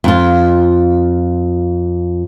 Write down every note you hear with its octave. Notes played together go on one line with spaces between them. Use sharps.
F2 F4